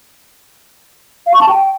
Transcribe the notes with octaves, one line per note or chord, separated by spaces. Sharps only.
F5
C#6
A5
G5